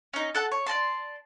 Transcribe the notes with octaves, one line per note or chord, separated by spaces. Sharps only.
C#4 D#4
A4 F#5 A5
C#5
D5 D#5 A5 C6